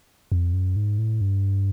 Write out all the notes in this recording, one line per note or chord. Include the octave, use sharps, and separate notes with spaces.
F2
F#2
G#2
A2
G2